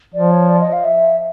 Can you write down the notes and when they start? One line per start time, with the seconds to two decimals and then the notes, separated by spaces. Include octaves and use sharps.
0.14 F3 D5
0.31 C#5
0.49 D5
0.60 D#5
0.73 F5
0.84 E5